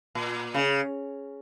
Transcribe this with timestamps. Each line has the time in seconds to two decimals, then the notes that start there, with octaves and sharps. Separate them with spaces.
0.15 A#2
0.54 C#3